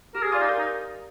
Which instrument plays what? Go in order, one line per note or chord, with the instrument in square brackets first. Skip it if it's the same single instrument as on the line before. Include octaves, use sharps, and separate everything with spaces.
[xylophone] G4 [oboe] A#4
[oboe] G#4
[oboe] F4 [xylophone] D5 F5 G#5 D6
[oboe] D#4
[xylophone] A#4
[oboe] D#4